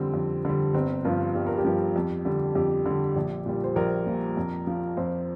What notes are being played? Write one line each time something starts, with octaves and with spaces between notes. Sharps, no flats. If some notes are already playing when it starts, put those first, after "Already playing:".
Already playing: F2 D3 G3 C4
F2
D3 G3
G1 C4
G2 F3 F4
G1 G4
A#4
G4
G2 F3
F2
D3 G3
F2 G4
D3 G3
A#1
A#2 G3
C5
A#1 A#4
A#2 G3
F2
F3
F2 C5